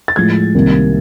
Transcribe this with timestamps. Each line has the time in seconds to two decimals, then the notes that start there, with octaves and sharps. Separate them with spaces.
0.08 A6
0.16 A2 F3 G#3 G#6
0.55 C2 C3 D#3 G3 A#3